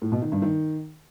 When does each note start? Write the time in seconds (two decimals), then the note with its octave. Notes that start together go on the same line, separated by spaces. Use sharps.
0.02 A2
0.12 B2
0.22 D#3
0.32 G2
0.42 D#3